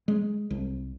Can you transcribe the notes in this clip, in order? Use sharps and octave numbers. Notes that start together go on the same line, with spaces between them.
G#3
C2